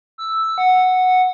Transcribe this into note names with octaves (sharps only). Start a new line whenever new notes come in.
E6
F#5